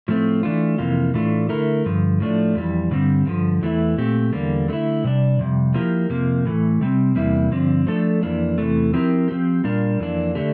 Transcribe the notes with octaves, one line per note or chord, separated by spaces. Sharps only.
A2 F3 A3 C4
E3 A3 D4 F4
F2 C3 E3 A#3 F4
A2 E3 A3 D4 F4
D3 A3 E4 A#4
G2 D3 F3
A2 F3 A3 D4
F2 E3 G3
G2 D3 G3 C4
G2 D3 F3
E2 E3 A3 E4
A#2 A3 C4 G4
E2 D3 G3 A#3
D3 A3 E4
C3 G3 D4
F2 C3 G3
F3 A#3 E4 G4 A#4
F2 C3 F3 A#3
A2 E3 A3
C3 G3 C4
E2 C3 G3 A#3 E4
G2 D3 F3 C4
F3 A3 D4 A4
F2 E3 A#3 D4
E2 C3 E3 A3
F3 C4 E4 G4 A#4
F3 C4 G4
A#2 G3 D4 F4 A#4
F2 E3 A#3 D4
D3 A3 D4 G4